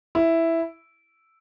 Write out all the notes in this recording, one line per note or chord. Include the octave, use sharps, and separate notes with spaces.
E4